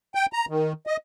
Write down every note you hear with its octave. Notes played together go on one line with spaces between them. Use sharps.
G5
A#5
D#3
D#5